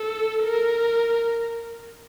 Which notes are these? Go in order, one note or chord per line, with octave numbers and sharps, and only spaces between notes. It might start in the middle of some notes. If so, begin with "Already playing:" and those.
Already playing: A4
A#4